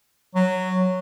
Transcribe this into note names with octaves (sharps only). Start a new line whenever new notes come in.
F#3